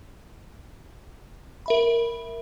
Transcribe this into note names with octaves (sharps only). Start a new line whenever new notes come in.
A#4 E5 B5